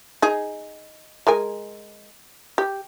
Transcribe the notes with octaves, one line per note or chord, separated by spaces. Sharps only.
D#4 G#4
G#3 A#4 G#5
G4